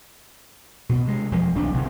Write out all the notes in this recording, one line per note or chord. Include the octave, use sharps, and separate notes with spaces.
B2
C3 G#3
E1 F2 F3 G#3
E1 B1 C4 D4
G1 C3 D#3 C4